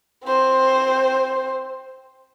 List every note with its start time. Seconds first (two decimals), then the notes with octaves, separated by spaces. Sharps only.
0.24 C4 C5